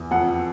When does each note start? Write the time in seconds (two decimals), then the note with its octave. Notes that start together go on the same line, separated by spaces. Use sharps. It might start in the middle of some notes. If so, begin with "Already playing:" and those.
Already playing: E2
0.11 F2 F#5